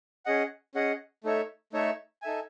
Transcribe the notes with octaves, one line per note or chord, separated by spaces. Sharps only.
C#4 G#4 D#5 F#5
C#4 G#4 D#5 F#5
A3 D#4 A4 C#5 E5
A3 D#4 A4 C#5 E5
D#4 A4 E5 G#5